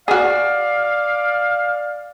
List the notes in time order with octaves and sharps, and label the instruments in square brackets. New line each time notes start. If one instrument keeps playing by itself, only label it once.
[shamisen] F#4 G#4 [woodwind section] D5 F5